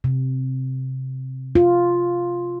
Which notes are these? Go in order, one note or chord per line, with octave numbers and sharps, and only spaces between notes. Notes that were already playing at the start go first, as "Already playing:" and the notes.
C3
F4